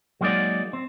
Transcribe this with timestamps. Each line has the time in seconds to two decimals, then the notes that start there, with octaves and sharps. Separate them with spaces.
0.21 F#3 G#3 A#3 D#4 D5
0.73 C4